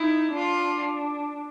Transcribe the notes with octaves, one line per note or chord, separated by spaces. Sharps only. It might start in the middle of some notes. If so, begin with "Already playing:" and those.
Already playing: D#4 E4
D4 F4